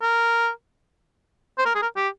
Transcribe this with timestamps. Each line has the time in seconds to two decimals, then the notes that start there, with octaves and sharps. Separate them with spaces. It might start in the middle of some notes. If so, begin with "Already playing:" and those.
0.02 A#4
1.59 C5
1.66 A#4
1.75 G#4
1.82 A#4
1.96 G4